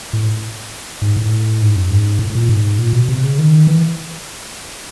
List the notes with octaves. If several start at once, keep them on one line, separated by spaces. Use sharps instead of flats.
A2
G#2
A2
G#2
F#2
G#2
A2
A2
A#2
G#2
A#2
B2
C3
C#3
D#3
E3